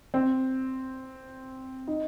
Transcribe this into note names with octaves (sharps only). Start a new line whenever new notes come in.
C4
D#4